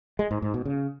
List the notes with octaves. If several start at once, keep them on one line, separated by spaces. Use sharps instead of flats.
G#3
G#2
G#2
B2
C#3